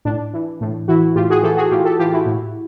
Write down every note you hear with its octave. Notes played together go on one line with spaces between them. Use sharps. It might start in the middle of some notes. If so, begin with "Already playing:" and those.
A2 D4
E3
A2
E3 E4 F#4
A2 F4 G4
F#4 G#4
E3 G4 A4
F#4 G#4
A2 F4 G4
G4 A4
E3 F4 G4
E4 F#4
A2